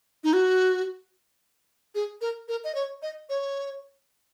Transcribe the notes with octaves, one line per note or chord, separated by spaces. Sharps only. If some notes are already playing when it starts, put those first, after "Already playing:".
D#4
F#4
G#4
A#4
A#4
D#5
C#5
D#5
C#5